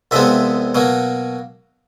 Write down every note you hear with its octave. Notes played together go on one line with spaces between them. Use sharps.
C2 C3 F3 G#3 B3 E5
B2 F#3 A#3